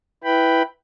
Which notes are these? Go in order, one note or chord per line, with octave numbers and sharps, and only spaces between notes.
E4 B4 G5 B5